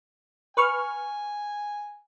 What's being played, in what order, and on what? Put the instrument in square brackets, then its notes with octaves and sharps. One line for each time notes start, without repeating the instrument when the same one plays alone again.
[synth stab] B4 C#6 F6 [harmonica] G#5